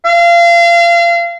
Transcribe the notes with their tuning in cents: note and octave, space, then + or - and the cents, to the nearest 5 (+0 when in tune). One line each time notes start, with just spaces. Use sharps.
F5 -30